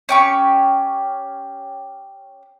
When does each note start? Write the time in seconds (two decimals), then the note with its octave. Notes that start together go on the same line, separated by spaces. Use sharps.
0.09 C#4 G4 C#6